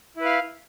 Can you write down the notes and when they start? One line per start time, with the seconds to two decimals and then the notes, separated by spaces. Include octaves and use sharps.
0.16 E4
0.21 B4
0.25 F5